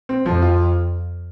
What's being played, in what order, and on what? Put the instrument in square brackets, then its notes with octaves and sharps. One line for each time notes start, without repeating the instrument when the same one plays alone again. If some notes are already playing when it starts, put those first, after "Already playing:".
[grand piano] C4
[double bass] F2 [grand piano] F3
[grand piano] F4